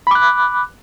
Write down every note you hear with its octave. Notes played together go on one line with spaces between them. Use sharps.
B5 D6 F#6